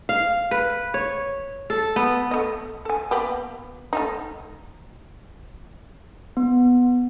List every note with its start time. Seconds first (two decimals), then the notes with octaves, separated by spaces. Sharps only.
0.09 F5
0.51 B4
0.94 C#5
1.70 A4
1.96 B3
2.31 A3 D#5
2.85 A4 G#5
3.11 A#3 B3 G4
3.93 A3 D4 D#4
6.37 B3